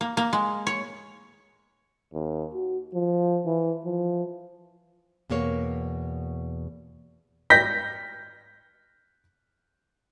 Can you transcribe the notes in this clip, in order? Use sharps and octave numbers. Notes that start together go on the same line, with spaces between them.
A#3
A#3
G#3
C#5
D#2
F#4
F3
E3
F3
E2 B2 A#3 C#5
G6 A#6 B6